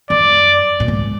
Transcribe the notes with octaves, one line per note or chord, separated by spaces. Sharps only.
F#2 D5
A#2
G#2